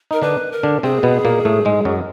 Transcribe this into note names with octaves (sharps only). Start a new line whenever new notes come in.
D#4 A#4
D3 D4 B4
A#4
D3 D4
C3 C4 G#4
B2 B3
A#2 A#3
A2 A3
G#2 G#3
F#2 F#3